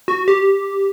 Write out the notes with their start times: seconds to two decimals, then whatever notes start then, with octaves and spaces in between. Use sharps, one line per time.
0.08 F#4
0.28 G4